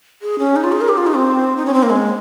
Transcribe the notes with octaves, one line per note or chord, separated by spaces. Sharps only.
G#4
C#4
D#4
F4
G#4
A#4
G4
F4
D#4
C4
D#4
C#4
C4
A#3
G#3